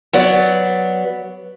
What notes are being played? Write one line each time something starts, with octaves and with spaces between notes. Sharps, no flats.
F#3 B3 D5